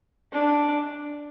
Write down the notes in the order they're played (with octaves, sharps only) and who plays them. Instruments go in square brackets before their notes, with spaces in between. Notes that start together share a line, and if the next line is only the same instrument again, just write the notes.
[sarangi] D4